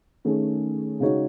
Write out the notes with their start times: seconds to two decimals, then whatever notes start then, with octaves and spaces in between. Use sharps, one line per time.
0.25 D#3 A3 C#4 G#4
1.00 C#3 G#3 D#4 F#4 C#5